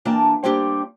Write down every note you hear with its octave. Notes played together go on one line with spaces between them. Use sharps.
E3 A#3 D4 G5 A5 A#5
G3 A#3 C4 D4 G4